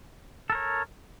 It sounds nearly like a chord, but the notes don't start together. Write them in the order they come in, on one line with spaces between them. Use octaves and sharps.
A4 A#4 C#5